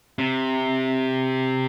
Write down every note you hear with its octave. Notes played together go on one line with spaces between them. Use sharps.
C3